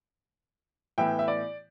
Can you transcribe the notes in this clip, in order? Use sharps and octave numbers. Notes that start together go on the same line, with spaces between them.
A2 E3 B3 E4 E5 G5
E5
D5